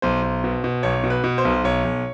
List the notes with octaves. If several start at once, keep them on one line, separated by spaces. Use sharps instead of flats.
B1 C5
B1
B2
B2
B1 C#5
B2
B4
B2
C5
B1
B1 C#5
B1